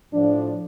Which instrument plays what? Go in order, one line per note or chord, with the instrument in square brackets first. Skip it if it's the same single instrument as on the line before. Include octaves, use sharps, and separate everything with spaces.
[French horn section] A2 F3 D4